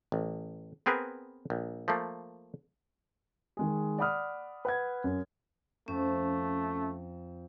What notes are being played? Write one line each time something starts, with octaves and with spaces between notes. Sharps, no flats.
A1
B3 C4 G#4 A#4 B4
A#1
F3 A3 A#3
D#3 G#3 G#4
D5 F#5 B5 D#6 F6
B4 F#5 G#6
F#2
F2 A3 C#4